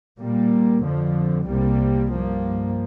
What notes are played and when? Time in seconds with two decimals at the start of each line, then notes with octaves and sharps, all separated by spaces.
0.20 A#2 G3 A#3
0.84 F2 D3 F3
1.47 C2 C3 G3 A#3
2.11 G2 F3 A#3